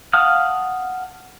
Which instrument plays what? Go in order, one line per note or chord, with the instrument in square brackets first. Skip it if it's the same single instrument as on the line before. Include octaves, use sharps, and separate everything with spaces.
[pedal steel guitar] F5 F#5 A5 D#6 F6